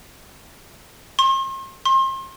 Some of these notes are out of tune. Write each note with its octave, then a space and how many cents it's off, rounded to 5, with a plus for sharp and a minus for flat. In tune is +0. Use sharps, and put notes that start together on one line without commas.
C6 +40
C6 +35